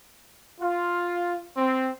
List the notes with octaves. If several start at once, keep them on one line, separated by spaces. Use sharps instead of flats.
F4
C4